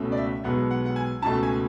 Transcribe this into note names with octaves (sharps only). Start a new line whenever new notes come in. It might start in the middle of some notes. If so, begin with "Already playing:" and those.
Already playing: C#2 B2 A3 C#4
D5
E5
B1 B2 G#3 B3 F#5
F#5
F#5
G#5
C#2 B2 A3 A5
G#5